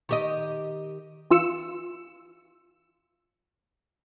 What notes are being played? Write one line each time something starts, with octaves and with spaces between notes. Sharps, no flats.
D#3 G4 D#5
E3 F4 E6 C#7 E7